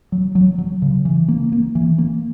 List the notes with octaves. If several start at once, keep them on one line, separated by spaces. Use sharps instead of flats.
F#3
F#3
F#3
C#3
E3
A#3
A#3
E3
A#3